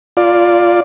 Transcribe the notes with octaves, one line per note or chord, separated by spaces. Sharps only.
F4 D5